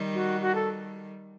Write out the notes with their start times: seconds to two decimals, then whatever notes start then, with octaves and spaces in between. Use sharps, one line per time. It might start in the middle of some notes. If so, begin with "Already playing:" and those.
Already playing: D#3 G3
0.14 F#4
0.42 F#4
0.55 A4